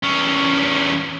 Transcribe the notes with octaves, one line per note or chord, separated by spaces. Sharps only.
E2 C#4